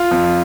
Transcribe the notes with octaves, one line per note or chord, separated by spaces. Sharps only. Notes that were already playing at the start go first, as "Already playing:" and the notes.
Already playing: F4
F2